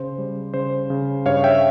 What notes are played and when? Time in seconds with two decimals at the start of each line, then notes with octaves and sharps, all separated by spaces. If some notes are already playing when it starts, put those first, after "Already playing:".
Already playing: C#3 C5
0.18 G3
0.54 C#3 C5
0.90 C#3
1.26 G2 C#5 F5
1.44 E5 G5